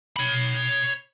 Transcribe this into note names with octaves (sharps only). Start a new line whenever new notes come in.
C#5 B5